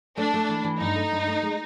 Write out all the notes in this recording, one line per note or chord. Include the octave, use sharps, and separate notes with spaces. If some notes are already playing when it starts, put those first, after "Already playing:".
A3 D4
A3
E3
E3
G2 D#4
A3
G2
A3
G#3